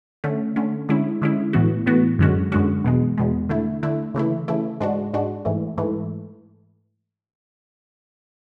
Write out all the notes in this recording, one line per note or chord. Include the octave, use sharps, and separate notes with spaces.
D3 A3 C#4
D3 A3 C#4
D3 G#3 C#4 E4
D3 G#3 C#4 E4
A2 E3 B3 F#4
A2 E3 B3 F#4
F#2 D3 G#3 C#4 F#4
F#2 D3 G#3 C#4 F#4
E2 B2 G#3
E2 B2 G#3
D3 A3 E4
D3 A3 E4
C#3 E3 A3 E4
C#3 E3 A3 E4
G#2 G#3 D4 F#4
G#2 G#3 D4 F#4
G#2 E3 A3
G#2 E3 A3